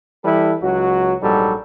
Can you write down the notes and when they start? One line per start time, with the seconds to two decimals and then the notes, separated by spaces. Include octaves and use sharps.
0.25 E3 G3 E4 A4 B4
0.63 C#2 F#3 F#4
1.22 A#1 G#2 F#3 G3 A4